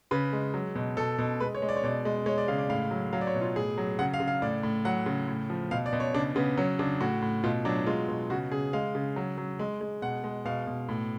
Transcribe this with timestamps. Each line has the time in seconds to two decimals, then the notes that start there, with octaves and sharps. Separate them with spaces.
0.11 C#3 B4
0.33 G#3
0.54 F#3
0.75 B2
0.97 B2 A4
1.18 B2
1.40 G#3 B4
1.55 C#5
1.62 G#3
1.69 D5
1.77 C#5
1.83 B2 D5
2.05 G#3
2.26 G#3 C#5
2.38 D5
2.48 C#3 F5
2.58 D5
2.70 A2 F5
2.91 F#3
3.13 F#3 F5
3.21 D5
3.27 C#5
3.34 B2
3.41 F4
3.56 A2 G#4
3.78 F#3
3.99 C#3 F#5
4.14 F5
4.20 C#3
4.28 F5
4.42 A2 D5
4.63 A2
4.85 F#3 F#5
5.06 C#3
5.28 A2
5.50 F3
5.71 B2 F5
5.86 D5
5.93 B2
6.00 C#5
6.14 C#3 D4
6.36 C#3 B3
6.57 F#3 C#4
6.79 C#3 D4
7.00 A2 F#4
7.22 A2
7.44 B2 F4
7.65 F#3 D4
7.86 G#3 F4
8.08 B2
8.30 C#3 F#4
8.52 C#3 G#4
8.73 G#3 F5
8.95 C#3
9.16 F#3
9.38 F#3
9.59 G#3
9.81 G#3
10.02 B2 F#5
10.24 G#3
10.45 B2 F5
10.67 B2
10.89 A2